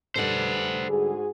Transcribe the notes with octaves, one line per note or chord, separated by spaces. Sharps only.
D3 G3 B4 C5 F#5
G#2 F#4 G#4